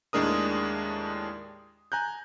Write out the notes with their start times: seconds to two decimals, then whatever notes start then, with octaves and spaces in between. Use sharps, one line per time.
0.13 D#2 A2 G#3 D4 A#4 D#6
1.92 G#5 A#5 F#6 G6